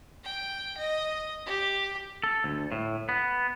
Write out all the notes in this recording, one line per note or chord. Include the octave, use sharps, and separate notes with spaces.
G5
D#5
G4
A4
D2
A2
B3